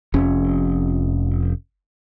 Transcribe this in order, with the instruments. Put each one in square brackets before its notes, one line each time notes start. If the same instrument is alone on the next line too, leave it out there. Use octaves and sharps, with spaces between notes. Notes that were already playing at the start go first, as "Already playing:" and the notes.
[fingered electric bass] F1 F2 C#4